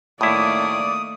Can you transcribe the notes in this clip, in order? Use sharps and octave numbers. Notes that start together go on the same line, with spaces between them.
A2 D#3 A3 A#3 E4 D5 D#6